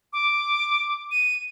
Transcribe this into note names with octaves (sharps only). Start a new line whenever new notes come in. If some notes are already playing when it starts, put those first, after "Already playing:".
D6
D#7